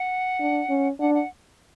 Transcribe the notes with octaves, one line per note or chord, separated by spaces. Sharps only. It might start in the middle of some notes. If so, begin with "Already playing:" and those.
Already playing: F#5
D4
C#4
D4 F#5
F#5